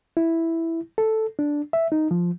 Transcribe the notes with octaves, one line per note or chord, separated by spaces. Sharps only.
E4
A4
D4
E5
D#4
F3